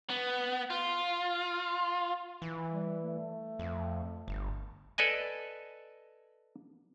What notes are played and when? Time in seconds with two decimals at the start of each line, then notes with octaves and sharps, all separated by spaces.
0.10 B3
0.70 F4
2.42 E3
2.70 G3
3.02 A3
3.59 F2
4.28 G1
4.98 A4 B4 D5 D#5 G#5